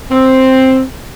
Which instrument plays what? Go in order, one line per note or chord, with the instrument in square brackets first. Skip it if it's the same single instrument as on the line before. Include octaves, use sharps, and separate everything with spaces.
[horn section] C4